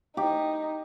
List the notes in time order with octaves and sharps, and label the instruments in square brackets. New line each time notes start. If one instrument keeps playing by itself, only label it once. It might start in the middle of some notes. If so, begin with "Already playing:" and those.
[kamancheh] D#4 [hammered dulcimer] G4